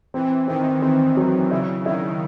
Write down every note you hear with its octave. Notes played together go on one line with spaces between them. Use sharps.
E3 C4
D#3 C4
E3 C4
F#3
C#3 E4
D#3 E4